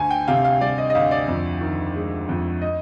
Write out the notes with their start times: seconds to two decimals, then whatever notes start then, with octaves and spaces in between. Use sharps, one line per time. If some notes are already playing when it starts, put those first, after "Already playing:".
Already playing: D2 G#5
0.11 G5
0.28 C3 F5
0.45 F5
0.61 G3 D5
0.78 D#5
0.90 D#5
0.95 D2 F5
1.11 D5
1.28 F2
1.61 D#3
1.95 G#3
2.29 F2
2.62 D#5